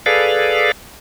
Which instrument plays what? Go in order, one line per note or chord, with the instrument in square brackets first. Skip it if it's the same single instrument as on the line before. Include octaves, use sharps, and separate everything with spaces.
[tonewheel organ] G#4 A4 B4 D5 F5